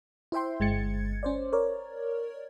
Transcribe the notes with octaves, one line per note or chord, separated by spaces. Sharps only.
E4 C5 E5 G5 C6
G1 G#3 G#6 A6 C#7
C#4 C5 D5
A#4 C#5 D5